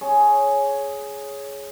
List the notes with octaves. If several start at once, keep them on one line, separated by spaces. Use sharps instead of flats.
G#4 C#5